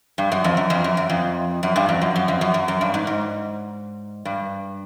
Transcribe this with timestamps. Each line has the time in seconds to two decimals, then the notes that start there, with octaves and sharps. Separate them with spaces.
0.18 G2
0.32 F#2
0.44 F2
0.57 F#2
0.70 F2
0.84 F#2
0.97 F#2
1.10 F2
1.63 F#2
1.76 G2
1.89 F2
2.01 F#2
2.16 F#2
2.28 F2
2.41 F#2
2.54 F#2
2.68 F#2
2.81 G2
2.94 G#2
3.07 G#2
4.25 G2